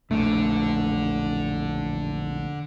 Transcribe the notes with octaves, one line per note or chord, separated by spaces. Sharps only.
E1 A#1 D3 A3